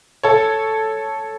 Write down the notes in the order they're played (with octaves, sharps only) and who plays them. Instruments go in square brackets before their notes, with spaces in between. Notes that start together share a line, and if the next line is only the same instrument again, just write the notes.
[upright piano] A4 C#5